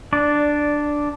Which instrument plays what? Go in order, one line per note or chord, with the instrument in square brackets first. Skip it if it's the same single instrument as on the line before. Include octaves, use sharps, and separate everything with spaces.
[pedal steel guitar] D4 D5